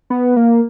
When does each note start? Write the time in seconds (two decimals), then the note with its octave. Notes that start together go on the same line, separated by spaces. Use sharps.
0.10 B3
0.36 A#3